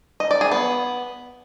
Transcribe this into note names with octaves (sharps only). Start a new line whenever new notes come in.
D#5
D5
G#4
B3